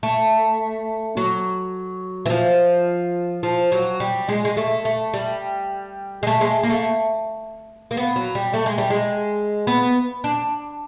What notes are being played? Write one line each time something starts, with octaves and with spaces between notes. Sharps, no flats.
A3
F#3
E3
F3
F3
F#3
G3
G#3
G#3
A3
A3
G3
G#3
A3
G#3
A#3
A3
A#3
B3
F#3
G3
A3
G#3
G3
G#3
B3
D4